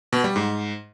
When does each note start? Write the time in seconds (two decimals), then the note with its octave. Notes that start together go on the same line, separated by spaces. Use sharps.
0.13 B2
0.24 G3
0.36 G#2